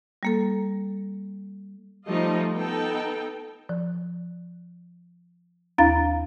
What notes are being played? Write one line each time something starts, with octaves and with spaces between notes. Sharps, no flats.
G3 A#3 A4
F3 G3 A3 D#4 F4 D#5
B3 D#4 A4 G5
F3
D#2 D4 E4 F5 A#5 A6